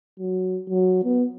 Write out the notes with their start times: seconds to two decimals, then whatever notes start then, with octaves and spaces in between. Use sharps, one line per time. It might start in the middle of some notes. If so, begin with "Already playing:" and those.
0.19 F#3
0.69 F#3
1.04 B3